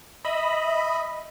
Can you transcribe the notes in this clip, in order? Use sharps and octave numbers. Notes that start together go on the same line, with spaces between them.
D#5 E5 B5